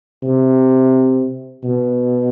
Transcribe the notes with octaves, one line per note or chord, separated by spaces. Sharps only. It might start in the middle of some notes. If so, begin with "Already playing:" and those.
C3
B2